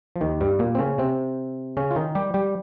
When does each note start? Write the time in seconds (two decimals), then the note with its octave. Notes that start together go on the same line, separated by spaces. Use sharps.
0.16 F3
0.21 D#2 D#3
0.41 G2 G3
0.59 A#2 A#3
0.75 C4
0.79 C#3 C#4
0.98 C3 C4
1.77 C#3 C#4
1.91 F4
1.96 D#3 D#4
2.15 G3 G4
2.34 G3 G4